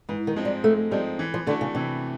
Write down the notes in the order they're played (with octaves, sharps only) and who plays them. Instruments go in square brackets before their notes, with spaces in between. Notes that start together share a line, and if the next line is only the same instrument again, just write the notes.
[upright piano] G#2 [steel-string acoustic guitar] E3
[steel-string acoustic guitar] D#3
[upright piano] F3 G#3 C4 D#4
[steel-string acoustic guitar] G3
[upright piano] G#2 [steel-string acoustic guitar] A3
[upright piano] F3 G#3 C4 D#4 [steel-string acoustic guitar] G3
[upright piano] E3
[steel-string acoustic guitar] F3
[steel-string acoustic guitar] D3 [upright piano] A3 D4 F#4
[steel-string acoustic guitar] C#3
[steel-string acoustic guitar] C3 [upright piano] E3